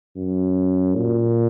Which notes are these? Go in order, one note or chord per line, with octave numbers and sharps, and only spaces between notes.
F#2
A#2